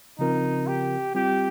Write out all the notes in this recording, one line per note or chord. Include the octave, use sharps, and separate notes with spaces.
C#3 F3 C4 D#4 F4 A#4
G4
G3 C4 F4 G4